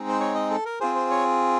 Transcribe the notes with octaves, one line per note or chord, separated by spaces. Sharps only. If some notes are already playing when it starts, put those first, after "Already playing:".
Already playing: G#3 C4 D#4
C5
C#5
D#5
A4
A#4
C4 F4 G#4 C5
C5
C#5